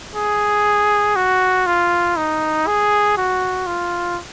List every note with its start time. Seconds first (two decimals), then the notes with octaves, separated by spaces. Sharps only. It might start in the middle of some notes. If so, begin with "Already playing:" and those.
0.16 G#4
1.16 F#4
1.67 F4
2.16 D#4
2.67 G#4
3.17 F#4
3.67 F4